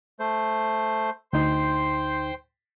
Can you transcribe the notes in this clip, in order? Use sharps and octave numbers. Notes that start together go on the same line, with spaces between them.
A3 C5
D2 D#4 C5 G5 C6